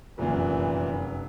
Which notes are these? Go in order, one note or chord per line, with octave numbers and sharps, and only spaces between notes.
F1 F#2 A#2 E3